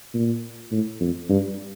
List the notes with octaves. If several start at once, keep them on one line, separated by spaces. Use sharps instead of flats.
A#2
A2
F2
G2